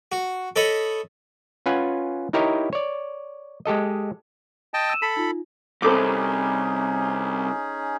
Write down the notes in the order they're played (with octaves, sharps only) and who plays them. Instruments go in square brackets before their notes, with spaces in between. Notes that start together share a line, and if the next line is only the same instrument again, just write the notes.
[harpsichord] F#4
A4 C#5 D#5 B5
[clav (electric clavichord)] C#4 F4 B4 F#5 G#5
D#4 E4 G4 A#4 C#5 D#5
C#5 D5
G#3 G4 A4 D#5
[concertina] D#5 G5 A5
[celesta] E6 D#7 E7
[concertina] A4 B5 [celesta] B6
[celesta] D#4 F4
[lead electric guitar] C2 [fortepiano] C4 A4 D6 [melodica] C#4 D#4 G#4